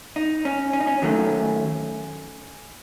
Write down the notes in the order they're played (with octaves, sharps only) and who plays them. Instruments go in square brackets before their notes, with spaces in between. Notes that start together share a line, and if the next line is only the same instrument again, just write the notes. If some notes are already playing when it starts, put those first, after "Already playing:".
[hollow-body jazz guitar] D#4
C#4
C#4
D#4
C#4
D#2 D#3 F#3 A3